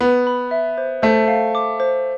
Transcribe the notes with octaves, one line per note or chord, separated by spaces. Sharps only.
B3 B5
B5
E5
C5
A3 C5
F5
D6
C5